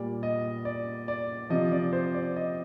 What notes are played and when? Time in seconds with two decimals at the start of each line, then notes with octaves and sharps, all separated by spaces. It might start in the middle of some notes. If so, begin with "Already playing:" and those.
Already playing: A#2 G3 D5
0.23 D#5
0.65 D5
1.08 D5
1.50 C3 F3 D#5
1.72 D5
1.93 C5
2.14 D5
2.36 D#5